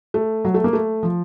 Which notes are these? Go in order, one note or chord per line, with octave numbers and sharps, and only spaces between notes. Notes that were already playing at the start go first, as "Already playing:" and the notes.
A3
F#3
A3
A#3
A3
F3